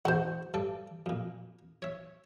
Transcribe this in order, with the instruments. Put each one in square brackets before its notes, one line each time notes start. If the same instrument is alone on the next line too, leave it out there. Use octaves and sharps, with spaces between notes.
[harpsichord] E2 G#2 B2 [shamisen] C5 F#5
[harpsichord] G2 A4 D5
F2 A#2
C#5 E5